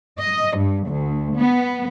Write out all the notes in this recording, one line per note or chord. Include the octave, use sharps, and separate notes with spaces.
D#5
G2
D2
B3